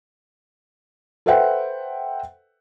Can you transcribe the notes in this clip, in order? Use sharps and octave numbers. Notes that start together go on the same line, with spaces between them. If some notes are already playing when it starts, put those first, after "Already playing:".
A4 B4 C5 E5 F#5 G5